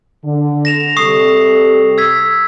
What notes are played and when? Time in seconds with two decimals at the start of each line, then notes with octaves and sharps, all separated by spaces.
0.24 D3
0.65 A#6 E7 F7
0.96 C3 G3 A4 C#6 D#6 C7
1.98 E6 G#6 B6